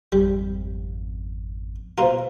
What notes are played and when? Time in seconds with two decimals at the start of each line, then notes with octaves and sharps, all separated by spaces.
0.12 G#1 F2 G3
1.98 B2 A#3 F4 C5 F5 A#5